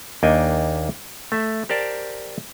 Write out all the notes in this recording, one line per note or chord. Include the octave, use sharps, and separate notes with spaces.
D#2 A#3 D4 D#4 G5 G#5
A3 E5
G4 A#4 C5 D5 A5